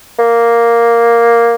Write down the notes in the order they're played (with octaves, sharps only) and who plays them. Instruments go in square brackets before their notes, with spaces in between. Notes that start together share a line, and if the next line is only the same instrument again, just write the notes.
[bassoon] A#3